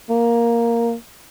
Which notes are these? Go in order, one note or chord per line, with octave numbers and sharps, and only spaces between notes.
A#3